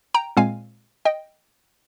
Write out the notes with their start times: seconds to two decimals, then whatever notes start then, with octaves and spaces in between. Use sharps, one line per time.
0.14 G5 A#5
0.37 A#2 G#3 C4 F5 G#5
1.05 D#5 G5